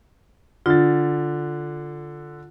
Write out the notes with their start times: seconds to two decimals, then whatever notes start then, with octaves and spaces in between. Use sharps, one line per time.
0.66 D3 F4 A6